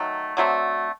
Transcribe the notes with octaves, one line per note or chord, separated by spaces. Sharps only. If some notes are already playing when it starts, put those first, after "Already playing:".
Already playing: D#3 F#3 A3
D3 F#3 A3 C4